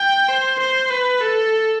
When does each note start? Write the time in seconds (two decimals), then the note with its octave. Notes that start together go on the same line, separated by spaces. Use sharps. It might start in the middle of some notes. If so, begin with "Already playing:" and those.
Already playing: G5
0.29 C5
0.60 C5
0.90 B4
1.21 A4